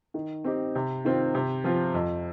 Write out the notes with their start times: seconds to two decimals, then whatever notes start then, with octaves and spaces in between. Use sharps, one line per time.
0.14 D#3
0.44 C4 D#4 G4
0.75 C3
1.05 D#3 C4 F4
1.35 C3
1.64 F3 C4 F4
1.94 F2